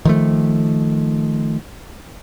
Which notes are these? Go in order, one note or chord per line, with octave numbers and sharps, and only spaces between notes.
D#3 F3 A3